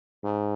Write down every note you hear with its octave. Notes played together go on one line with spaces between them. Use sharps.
G#2